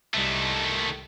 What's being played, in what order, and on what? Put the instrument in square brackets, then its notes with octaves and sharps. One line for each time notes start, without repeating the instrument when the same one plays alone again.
[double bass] C2 [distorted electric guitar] D#3 A3